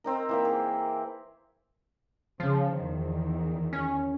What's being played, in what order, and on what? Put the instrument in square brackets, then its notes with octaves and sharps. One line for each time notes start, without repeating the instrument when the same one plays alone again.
[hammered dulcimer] C4 D#4 A#4
E3 A#3 E5
G#4
[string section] C#3 [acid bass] F3
[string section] E2 D#3
[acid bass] C#4